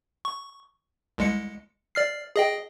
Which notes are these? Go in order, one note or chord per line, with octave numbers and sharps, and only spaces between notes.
C#6
C2 G#3 C#7
D5 F6 C7
G#4 D#5 G5